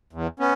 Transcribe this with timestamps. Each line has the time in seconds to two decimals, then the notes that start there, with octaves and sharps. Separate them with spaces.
0.13 E2
0.40 B3 C#4